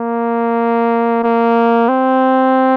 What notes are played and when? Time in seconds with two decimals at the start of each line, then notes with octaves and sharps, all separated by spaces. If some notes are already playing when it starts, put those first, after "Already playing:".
Already playing: A#3
1.23 A#3
1.89 C4